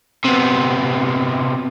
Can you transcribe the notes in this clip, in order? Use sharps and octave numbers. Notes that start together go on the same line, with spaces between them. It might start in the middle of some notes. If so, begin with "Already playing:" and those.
C3 B3